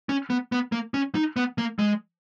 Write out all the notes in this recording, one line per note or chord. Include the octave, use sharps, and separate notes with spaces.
C#4
B3
B3
A#3
C#4
D#4
B3
A#3
G#3